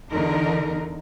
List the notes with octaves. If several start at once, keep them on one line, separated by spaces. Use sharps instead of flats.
E2 D3 D#4 A#4